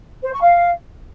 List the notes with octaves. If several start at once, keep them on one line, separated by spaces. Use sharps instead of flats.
C5
C#6
F5